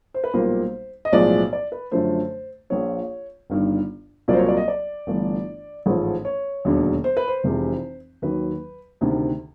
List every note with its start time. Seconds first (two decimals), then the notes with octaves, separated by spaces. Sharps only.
0.14 C5
0.24 B4
0.33 B1 A#2 G3 A#3 C5
1.05 D#5
1.13 B1 A2 F3 G#3 D5
1.53 D5
1.72 B4
1.91 F#2 D3 F3 A3 C5
2.70 A#1 A#2 F3 C#5
3.50 G1 G2 D#3
4.28 C2 A#2 F#3 A#3 D5
4.33 C5
4.39 C#5
4.48 D5
4.57 D#5
4.68 D5
5.07 G1 G2 E3 A3
5.86 A1 G#2 F3 A3
6.25 C#5
6.65 E1 D#2 D3 F#3
7.04 C5
7.17 B4
7.28 C5
7.44 F1 F2 C3 E3 G#3
8.22 D#2 D#3 F#3 B4
9.01 D2 C3 D#3